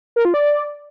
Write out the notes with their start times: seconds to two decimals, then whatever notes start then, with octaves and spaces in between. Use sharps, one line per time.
0.16 A#4
0.25 F4
0.34 D5